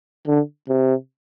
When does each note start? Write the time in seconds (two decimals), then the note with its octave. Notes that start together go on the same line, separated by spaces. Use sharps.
0.27 D3
0.69 C3